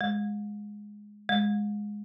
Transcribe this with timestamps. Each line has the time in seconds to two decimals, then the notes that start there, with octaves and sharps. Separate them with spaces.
0.01 G#3
1.29 G#3